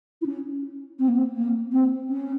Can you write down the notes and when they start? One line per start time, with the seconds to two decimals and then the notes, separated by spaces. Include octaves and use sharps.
0.21 E4
0.25 C#4
0.99 C4
1.08 A#3
1.16 C4
1.35 A#3
1.72 C4
2.09 C#4